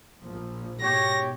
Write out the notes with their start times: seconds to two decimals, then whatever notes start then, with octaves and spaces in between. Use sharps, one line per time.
0.23 A#1 F3
0.81 G#2 B2 G4 C#5 A#6